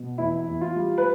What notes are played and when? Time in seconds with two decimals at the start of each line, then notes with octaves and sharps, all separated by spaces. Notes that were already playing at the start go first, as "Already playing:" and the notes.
Already playing: B2
0.18 E2 E4
0.47 E2
0.61 F4
0.76 G3
0.98 B4